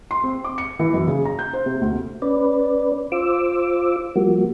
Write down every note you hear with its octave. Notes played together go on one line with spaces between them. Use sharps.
C6
C4
D6
C#7
E3
F#2
C#3
A#5
G6
C5
C3
D2
C#4 B4 D5
F4 C5 D6 E6
F3 G3 A#3 F#4